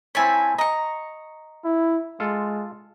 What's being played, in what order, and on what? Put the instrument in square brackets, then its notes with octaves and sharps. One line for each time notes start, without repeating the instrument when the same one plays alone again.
[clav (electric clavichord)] C4 E4 C#5 [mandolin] G#5 A5 B5
[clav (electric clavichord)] D#5 [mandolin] A#5 C#6
[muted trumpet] E4
[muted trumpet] G#3 [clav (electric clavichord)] F4 A4